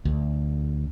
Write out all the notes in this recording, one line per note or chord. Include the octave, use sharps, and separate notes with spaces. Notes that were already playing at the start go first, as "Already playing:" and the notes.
D2